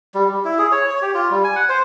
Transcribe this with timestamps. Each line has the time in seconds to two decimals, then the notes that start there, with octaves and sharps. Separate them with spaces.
0.15 G3
0.29 G3
0.45 E4
0.59 G#4
0.72 C#5
0.90 C#5
1.02 G4
1.14 F4
1.31 G3
1.44 G#5
1.56 F#5
1.69 C5